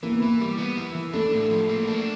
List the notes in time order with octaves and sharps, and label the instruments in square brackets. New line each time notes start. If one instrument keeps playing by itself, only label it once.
[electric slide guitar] E3 [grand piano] A#3
[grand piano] B3
[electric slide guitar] E3 [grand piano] A#3
[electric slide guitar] G3
B3
E3
E3
[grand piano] A3 [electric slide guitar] D4
[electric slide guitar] A2
F3
A#3
D4